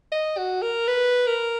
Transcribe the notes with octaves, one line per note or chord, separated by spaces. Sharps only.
D#5
F#4
A#4
B4
A#4